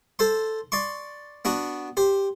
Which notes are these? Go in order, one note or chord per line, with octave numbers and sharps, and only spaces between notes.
A4 C5 C6
D5 C6 C#6
B3 D4 F#4
G4 C5